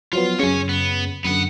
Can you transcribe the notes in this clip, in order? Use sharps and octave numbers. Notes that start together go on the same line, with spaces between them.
F3 F#3 B3 F4
F#2 C#3 C#5 G#5
B3
F#2 D3 B3 F#5